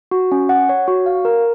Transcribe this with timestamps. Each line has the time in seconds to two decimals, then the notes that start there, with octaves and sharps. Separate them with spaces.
0.11 F#4
0.32 C#4
0.49 F#5
0.69 C#5
0.88 F#4
1.06 F5
1.25 A#4